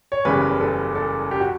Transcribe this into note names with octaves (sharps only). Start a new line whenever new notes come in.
C#5
F#1 E2 C#3 G3 B4
A4
A4
G4
F#4